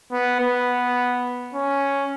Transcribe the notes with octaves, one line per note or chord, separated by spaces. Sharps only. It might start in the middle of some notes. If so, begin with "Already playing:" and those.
B3
B3
C#4